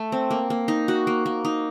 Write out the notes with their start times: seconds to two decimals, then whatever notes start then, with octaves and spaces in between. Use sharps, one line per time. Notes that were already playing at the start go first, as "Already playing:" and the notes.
Already playing: A3
0.12 C4
0.31 A#3
0.50 A#3
0.68 D#4
0.88 F#4
1.07 A#3
1.26 A#3
1.45 D#4